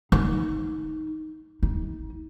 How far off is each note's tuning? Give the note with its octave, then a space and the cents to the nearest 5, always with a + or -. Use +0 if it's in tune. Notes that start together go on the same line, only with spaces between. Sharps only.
D#4 +10
D#4 +40